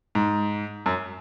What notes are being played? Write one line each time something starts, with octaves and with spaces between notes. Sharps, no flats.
G#2
F#2